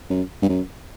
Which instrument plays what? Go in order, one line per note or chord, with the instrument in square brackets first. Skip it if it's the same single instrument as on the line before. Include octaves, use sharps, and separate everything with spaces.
[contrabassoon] F#2
G2
F#2